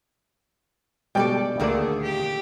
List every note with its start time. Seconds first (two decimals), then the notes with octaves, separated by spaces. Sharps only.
1.15 B2 G3 G#3 A4 D5 G5
1.60 D2 A#2 D#3 A#3 G#4 A4 D5
2.03 G4